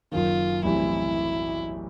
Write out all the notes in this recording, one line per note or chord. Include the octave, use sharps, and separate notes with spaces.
F#1 F#2 D#3 F4
B1 A2 E3 G3 C4 E4